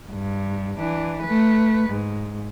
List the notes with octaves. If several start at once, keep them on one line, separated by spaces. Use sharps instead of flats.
G2
E3 D4
A3 B4
G#2